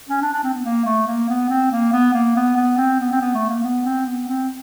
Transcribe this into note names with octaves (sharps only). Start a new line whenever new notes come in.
C#4
D4
D4
C4
B3
A#3
A3
A#3
B3
C4
A#3
B3
A#3
B3
B3
C4
B3
C4
B3
A3
A#3
B3
C4
B3
C4